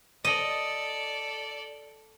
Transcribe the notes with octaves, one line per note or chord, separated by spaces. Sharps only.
A4 D5 D#5